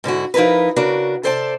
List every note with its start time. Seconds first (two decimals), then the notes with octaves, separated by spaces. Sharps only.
0.04 G#2 D3 E4 F#4
0.34 F3 D#4 E4 A#4 B4
0.76 C#3 D4 F#4 A#4
1.23 C3 A4 C5 D5 F5 A5